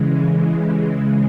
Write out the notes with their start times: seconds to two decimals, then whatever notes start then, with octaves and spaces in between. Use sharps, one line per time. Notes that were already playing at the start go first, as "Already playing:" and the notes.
Already playing: C#3 E3 G#3
0.11 G#4
0.58 G4